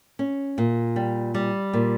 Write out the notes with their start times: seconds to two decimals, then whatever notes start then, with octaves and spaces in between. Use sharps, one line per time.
0.19 C#4
0.58 A#2
0.96 G3
1.35 G3
1.73 A#2